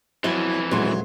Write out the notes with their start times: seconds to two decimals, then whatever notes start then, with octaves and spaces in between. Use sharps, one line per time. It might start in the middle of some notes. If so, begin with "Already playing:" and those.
0.24 F2 E3 F#3 E4
0.71 D#1 D2 F#3 G#3 C6